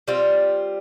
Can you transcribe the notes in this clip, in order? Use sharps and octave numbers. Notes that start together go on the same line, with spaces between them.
G3 C4 F4